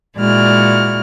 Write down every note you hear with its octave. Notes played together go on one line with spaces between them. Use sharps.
A#2 G#3 E4 F#4 D5 F6